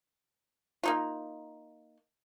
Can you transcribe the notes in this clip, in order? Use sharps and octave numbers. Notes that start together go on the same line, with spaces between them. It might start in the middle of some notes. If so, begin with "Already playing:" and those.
A#3 D#4 F4